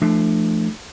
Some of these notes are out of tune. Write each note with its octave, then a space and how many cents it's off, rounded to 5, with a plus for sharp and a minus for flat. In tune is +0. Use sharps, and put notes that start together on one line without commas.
F3 -35 A3 -5 D4 +25